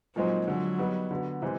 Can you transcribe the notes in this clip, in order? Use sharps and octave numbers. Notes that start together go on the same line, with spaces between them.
A#2 F3 F#3 G#3 C4 D#4
D3 F3 F#3 G#3
G3 B3 D#4
D3 F#3 B3
C3 E3 G#3 C4